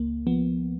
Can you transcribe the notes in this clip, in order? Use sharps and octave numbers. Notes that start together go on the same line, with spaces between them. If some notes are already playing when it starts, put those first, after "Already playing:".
Already playing: C#2 A#3
F3 B3